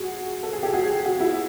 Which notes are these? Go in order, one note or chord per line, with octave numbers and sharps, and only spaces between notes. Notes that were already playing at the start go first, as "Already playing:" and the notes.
Already playing: F#4 G#4
A4
G#4
G4
F#4 G#4
F#4 G#4
E4 F#4